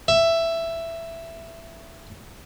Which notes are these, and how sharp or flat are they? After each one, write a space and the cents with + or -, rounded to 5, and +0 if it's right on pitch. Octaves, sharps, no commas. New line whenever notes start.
E5 +10